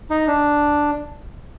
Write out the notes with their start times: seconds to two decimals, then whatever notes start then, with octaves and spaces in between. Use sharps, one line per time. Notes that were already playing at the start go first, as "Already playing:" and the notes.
0.10 D#4
0.28 D4